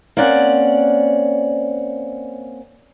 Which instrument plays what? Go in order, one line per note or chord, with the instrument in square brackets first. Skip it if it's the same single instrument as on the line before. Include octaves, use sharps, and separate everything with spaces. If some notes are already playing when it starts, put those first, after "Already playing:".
[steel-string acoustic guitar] A#3 C4 C#4 D5 F#5